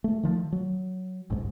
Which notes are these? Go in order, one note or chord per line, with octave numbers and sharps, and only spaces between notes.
A3
D#3 F3 G#3 A3
F#3
G1 C#2 G#2 G#3